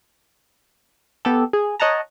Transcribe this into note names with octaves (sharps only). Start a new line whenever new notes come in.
B3 G4 A4
G#4
C#5 D#5 F#5 A5 A#5